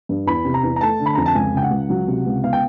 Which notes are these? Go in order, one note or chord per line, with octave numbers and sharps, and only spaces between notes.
G2
E2 B5
C3
A#5
E2
A#5
A3 A5
D3
B5
F2 A#5
A5
C#2 G#5
C#3 G5
F#5
C#2
F#3
C3
C#2
B3 F5
G5